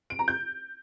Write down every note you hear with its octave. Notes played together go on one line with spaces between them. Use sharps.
D7
A#5
G6